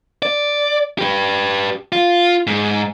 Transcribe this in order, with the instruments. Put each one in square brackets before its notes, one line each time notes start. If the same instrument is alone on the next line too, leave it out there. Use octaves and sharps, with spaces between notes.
[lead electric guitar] D5
G4 B4
F4
G#2